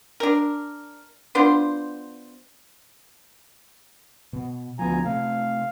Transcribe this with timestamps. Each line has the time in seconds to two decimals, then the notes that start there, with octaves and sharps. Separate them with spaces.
0.20 D4 A#4
1.35 B3 D4 F4 C5
4.33 B2
4.79 D2 F3 B3 G#5 A#5
5.05 C3 A3 F5